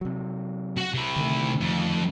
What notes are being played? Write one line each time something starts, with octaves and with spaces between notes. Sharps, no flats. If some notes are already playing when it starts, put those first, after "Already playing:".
C3 F#3
F#4 F#5
C3 E4
D3 D#3 A3
F2